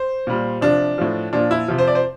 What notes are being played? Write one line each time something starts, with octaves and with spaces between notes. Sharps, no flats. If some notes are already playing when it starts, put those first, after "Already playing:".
Already playing: C5
A#2 G3
C3 F3 D4
A2 F3
A#2 F3 D4
E4
C3 F3
C5
D5
C5